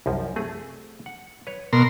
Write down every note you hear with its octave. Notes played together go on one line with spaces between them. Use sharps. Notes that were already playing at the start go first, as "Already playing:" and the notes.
C2 F#2 F3
A3 C4 G#4
F#5
B4 C#5
B2 A#4 C6